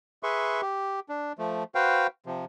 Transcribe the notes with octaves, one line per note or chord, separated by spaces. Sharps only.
G#4 B4 E5 C6 C#6
G4
D4
F3 A3
F#4 B4 C5 F5 G5
C3 F3